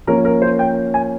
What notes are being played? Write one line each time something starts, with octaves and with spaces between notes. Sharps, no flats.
F3 A#3 C#4 A#4
A#4
C5
G5
G#5